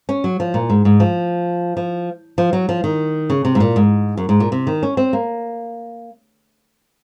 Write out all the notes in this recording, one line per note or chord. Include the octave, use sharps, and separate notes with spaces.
C#4
F#3
F3
A#2
G#2
G#2
F3
F3
F3
F#3
F3
D#3
C#3
C3
G#2
A#2
G#2
F#2
G#2
A#2
C3
D#3
C#4
C4
A#3